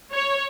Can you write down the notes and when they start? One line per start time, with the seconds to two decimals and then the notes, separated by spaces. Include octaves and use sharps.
0.12 C#5